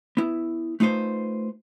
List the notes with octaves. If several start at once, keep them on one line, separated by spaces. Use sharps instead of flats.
B3 E4
A3 D#4 F4 B4 C5